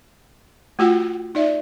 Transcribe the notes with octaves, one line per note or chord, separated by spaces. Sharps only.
A3 F4 F#4 F#5 G5
D#4 D5 E5